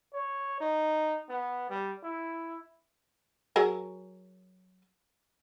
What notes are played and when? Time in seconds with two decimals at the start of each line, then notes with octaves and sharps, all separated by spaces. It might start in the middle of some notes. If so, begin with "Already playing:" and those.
0.14 C#5
0.61 D#4
1.29 B3
1.70 G3
2.03 E4
3.56 F#3 G#4 A#4